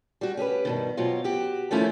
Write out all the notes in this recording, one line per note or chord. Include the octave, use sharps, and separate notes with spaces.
G3 F#4
C#4 G4 G#4 B4
G2 B2 D#3
B2 F#3 C4 F4
F#4 G4
D#3 F3 A3 C#4 E4 F4